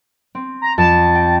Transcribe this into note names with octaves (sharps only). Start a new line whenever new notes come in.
C4
A#5
F2 A5
G5